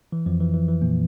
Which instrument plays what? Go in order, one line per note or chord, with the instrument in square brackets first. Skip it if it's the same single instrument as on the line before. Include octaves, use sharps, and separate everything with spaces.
[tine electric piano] E3
F2 F3
E3
E3
E3
A#2 A#3